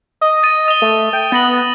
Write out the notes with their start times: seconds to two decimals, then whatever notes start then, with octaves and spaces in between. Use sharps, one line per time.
0.21 D#5
0.43 A6 D#7
0.68 D#6 G7
0.82 A3
1.13 G5
1.32 B3 A6 A#6 F#7